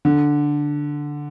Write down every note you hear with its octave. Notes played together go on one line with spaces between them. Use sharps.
D3